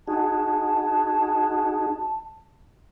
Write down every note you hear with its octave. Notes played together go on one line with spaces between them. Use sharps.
D#4 F#4 G#4 A5